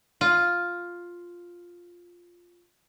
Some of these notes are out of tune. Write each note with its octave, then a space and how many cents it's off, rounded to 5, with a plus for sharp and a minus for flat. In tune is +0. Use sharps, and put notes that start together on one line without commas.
F4 +5